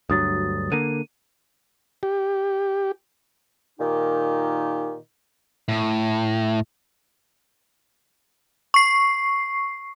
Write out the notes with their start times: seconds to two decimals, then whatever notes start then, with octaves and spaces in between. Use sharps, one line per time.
0.10 D2 G2 F#3 D#6 A6
0.72 D3 A#3 D#7
2.03 G4
3.80 A#2 D#3 D#4 G4
5.68 A2
8.74 C#6 C7